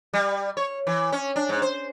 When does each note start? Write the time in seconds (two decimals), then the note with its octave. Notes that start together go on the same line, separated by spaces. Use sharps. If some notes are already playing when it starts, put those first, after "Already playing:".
0.13 G3
0.57 C#5
0.87 E3
1.12 C#4
1.36 D4
1.49 G#2
1.62 C5